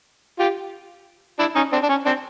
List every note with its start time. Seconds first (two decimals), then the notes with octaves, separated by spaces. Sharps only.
0.39 F4 G4
1.39 D4 E4
1.56 C#4 D#4
1.72 C4 D4
1.83 D4
1.89 C#4
2.06 C4 D4